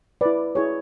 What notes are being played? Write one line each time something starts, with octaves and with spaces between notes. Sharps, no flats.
E4 B4 D5
E4 G#4 C#5